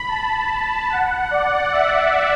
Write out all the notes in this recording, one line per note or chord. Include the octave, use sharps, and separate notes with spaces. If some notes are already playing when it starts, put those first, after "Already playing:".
Already playing: B5
A5
F#5
D5
E5